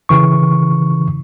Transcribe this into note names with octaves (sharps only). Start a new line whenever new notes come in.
C#3 E3 C#6